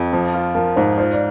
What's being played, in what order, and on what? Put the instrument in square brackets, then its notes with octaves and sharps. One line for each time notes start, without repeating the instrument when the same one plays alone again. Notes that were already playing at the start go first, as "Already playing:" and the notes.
Already playing: [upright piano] F2
F3
F4
[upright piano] F3 [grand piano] A#4
[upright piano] G#2 [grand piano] C5
[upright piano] F4 [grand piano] C5
[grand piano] D5